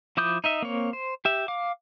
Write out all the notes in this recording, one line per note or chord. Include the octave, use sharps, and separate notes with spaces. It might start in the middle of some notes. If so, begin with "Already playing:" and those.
F3 E4 D6 D#6 G6
D#4 D#5 E5
A#3 C4 C#5
C5
G4 E5
F5 D6